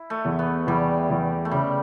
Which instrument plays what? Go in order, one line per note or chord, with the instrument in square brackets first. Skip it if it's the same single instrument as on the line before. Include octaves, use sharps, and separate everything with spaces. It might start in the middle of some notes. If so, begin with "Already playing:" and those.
Already playing: [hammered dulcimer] E4
A3
[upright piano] E2
[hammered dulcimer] B3
[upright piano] E2 [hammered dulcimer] G3
[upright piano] E2
[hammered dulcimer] A3
[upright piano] C#3 [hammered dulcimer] G3